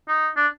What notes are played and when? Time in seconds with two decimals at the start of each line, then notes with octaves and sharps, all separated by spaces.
0.08 D#4
0.37 D4